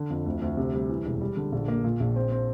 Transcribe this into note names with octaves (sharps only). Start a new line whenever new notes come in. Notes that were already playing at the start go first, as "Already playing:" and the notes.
Already playing: D3
F2
D2
D2
C3
G3
E3
E1
G3
D3
A#1
A#3
A#2
A#1
C4
C4